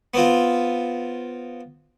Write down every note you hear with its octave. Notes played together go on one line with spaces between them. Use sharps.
B3 C4 F4